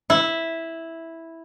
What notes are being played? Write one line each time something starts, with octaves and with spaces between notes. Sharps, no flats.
E4